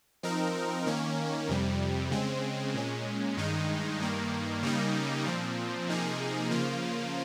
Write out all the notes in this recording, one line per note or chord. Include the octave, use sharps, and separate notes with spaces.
F3 C4 D#4 A#4
D#3 A#3 C#4
F2 C3 G3
C#3 G#3 C4
A#2 G#3 C#4
G2 D#3 G#3 D#4
G2 D#3 A#3
C#3 G3 A#3 D#4
A#2 F3 C4
C3 F3 A#3 D#4 G#4
C#3 F3 A#3 F4